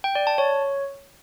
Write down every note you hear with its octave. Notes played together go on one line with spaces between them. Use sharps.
G5
D5
A5
C#5